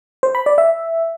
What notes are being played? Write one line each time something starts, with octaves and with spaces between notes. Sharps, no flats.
C5
B5
D5
E5